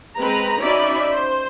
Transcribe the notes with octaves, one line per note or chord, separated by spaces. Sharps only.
G#3 C4 B4 A#5
C#4 D#4 F#4 D5 E5 B5
C5